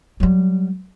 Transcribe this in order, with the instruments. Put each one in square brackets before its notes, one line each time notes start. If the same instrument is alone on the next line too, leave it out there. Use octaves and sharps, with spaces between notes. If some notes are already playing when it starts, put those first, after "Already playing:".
[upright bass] F#3 G3